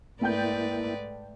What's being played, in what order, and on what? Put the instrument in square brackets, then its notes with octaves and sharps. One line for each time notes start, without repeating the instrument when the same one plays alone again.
[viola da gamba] G#2 B4 D5 [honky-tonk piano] A3 G5 G6 [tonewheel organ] A#3 E4